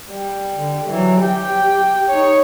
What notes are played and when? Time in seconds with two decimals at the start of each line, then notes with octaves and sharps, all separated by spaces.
0.11 G3
0.56 D3
0.89 E3 F#3
1.21 G4 G5
2.10 D#4 C#5